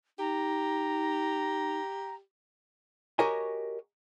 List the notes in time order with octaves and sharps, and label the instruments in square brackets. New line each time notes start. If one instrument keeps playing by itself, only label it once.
[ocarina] D#4 [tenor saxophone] G4 [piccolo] A#5
[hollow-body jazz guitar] F#4 G4 A#4 C#5 D#5 G#5